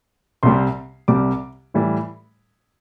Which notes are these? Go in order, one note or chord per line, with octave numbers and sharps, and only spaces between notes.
C2 C3 G3 C6
C2 C3 G3 D6
A2 E3 G3